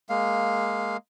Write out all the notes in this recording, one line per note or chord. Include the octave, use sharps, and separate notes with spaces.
G#3 A#3 F5